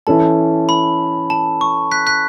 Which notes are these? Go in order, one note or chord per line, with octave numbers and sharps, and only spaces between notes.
E3 C#4 E4 A4 A5
B5
A5
C#6
F#6 B6
F#6 B6